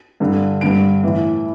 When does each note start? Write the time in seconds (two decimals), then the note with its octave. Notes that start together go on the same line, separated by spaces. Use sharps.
0.20 G2 D3
0.61 G2 D3 D7
1.03 A2 E3